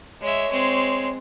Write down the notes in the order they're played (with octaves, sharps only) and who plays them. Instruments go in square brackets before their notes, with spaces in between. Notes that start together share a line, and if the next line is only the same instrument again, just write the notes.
[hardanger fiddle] G#3 E5 [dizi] C#5
[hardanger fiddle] G#3 C4